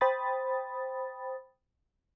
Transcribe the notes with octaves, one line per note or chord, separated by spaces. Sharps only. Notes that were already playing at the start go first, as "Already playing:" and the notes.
C5 G5 B5 D#6 A6